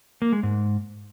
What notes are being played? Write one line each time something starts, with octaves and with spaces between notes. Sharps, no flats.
A#3
G#3
G#2